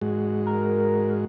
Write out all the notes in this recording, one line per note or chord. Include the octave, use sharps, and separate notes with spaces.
G#2 G#3 F#4
A#4